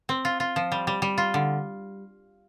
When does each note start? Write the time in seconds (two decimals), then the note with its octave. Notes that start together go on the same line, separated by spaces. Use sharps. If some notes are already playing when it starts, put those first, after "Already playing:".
0.09 C4
0.25 F4
0.40 F4
0.56 F3
0.72 G3
0.87 G3
1.02 G3
1.18 F4
1.34 D3